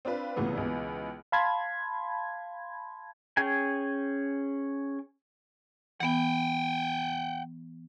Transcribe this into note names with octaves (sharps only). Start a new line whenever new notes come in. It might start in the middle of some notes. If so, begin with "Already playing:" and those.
C4 D4 F4 B4
C2 A#2 C#3 E3 A3 B3
C#2 B2 E3
F5 A5 B5 C6 G#6
C#4 G#4 G5 G#5
E3 B3 F#5 G5